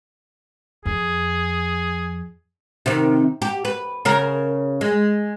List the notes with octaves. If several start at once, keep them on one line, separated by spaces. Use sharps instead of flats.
F2 G#4
C3 D#3
G4
B4
C#3 A#4
G#3